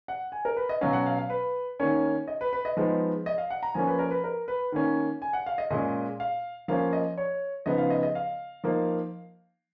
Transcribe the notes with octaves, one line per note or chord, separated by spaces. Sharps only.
F#5
G#5
A#4
B4
D#5
B2 F#3 C#4 F5
F#5
F5
F5
B4
D#3 A#3 C#4 C#5
D#5
B4
B4
D#5
F3 G#3 B3 D#4
D#5
F5
F#5
A#5
F3 A#3 C#4 G#5
B4
A#4
B4
A#4
B4
D#3 A#3 C#4
G#5
F#5
F5
D#5
A#2 G#3 C#4 D#5
F5
F3 A#3 C#4 F5
D#5
C#5
C#3 F3 B3 D#4 D#5
F5
D#5
D#5
F5
F3 A#3 D#4